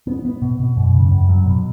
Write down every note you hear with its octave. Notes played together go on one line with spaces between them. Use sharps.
B3
B3
B2
B2
F#2
C#3
F#2
F#3
B2